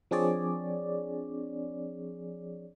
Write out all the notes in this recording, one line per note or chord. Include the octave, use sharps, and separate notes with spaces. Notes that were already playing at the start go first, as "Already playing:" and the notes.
F3 C4 D4 G#4 C#5 D5